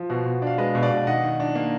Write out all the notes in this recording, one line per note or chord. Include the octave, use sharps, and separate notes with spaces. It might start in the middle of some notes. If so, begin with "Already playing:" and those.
Already playing: F3
B2 F#4
B2
D4 F5
G#3 B4 D#5
B2
D5 F5
B2
D#3 D#5 F#5
D#3
D4
A#3